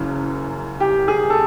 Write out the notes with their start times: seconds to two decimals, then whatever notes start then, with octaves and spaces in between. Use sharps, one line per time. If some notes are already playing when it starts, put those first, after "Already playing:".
Already playing: F#1 F#2 C#3 E3
0.80 G4
1.08 G#4
1.30 A4